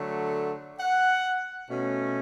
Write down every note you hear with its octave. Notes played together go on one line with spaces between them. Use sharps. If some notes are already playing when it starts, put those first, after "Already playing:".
Already playing: D3 F#3 A3
F#5
B2 A3 C#4